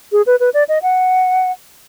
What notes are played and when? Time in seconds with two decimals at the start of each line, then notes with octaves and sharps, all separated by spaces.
0.12 G#4
0.26 B4
0.40 B4
0.54 D5
0.69 D#5
0.83 F#5